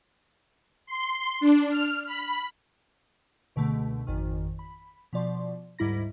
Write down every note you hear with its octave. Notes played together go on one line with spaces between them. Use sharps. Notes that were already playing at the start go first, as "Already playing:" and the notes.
C6
D4
F6
B5
C#2 B2 D3 A3
G#1 F2 D#3
B5
B2 F3 D5 C6
D2 G#2 G3 E4 B5 A#6